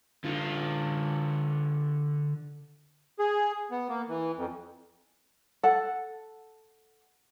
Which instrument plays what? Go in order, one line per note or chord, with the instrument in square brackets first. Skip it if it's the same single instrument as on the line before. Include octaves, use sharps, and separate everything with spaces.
[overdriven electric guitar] D3 F4
[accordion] G#4
B3
A#3
E3
F2
[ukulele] A4 F#5